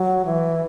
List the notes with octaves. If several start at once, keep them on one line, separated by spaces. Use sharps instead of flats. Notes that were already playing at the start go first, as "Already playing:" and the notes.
Already playing: F#3
E3